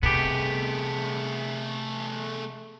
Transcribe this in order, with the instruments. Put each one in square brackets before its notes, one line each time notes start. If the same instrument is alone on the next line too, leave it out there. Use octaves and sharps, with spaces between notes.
[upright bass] C3 [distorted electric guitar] A3 G#4 [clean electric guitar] B3 G4